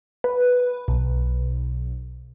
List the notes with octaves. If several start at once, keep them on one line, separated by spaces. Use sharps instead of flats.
B4
B1